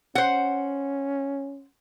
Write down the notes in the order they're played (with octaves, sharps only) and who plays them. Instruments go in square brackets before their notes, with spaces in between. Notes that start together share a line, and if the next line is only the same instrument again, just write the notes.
[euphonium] C#4 [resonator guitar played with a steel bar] C5 F#5